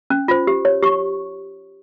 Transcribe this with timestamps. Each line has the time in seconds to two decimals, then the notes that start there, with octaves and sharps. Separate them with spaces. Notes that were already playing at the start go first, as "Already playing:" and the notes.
0.10 C#4
0.28 F4 C5
0.47 G4
0.65 C#5
0.83 G4 C#6